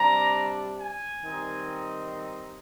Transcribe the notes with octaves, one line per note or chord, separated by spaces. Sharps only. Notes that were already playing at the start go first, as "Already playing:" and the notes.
Already playing: C3 G3 D4 A#5
G#5
D#3 G3 C4 D#4